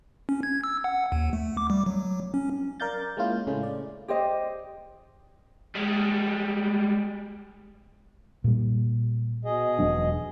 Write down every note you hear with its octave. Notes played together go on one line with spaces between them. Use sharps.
C#4
G#6
E6
F#5
D#2
A3
D6
G3
F#3
C#4
A#4 D5 F5 G6 A6
G#3 A#3 C#4 E4 F4
A2 C#3 G#3 A3 C#4 G#4
D5
G4 C5 D5 D#5
G3 G#3
A#2 G3
B2 G#4 D#5
E1 F#3 D4